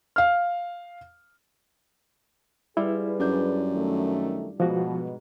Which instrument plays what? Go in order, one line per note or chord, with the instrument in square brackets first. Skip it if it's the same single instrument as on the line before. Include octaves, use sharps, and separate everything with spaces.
[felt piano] F5 F6
[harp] G3 F4 [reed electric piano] E4 [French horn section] G#4 B4
[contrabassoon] F#2 [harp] D4 G6
[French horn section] D#3 A3
[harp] G#2 [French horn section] B2 [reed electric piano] F3 F#4